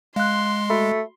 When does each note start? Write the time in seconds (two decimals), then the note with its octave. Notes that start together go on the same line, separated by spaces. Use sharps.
0.16 G#3 F5 C6 F#6
0.70 A3 F#4 B5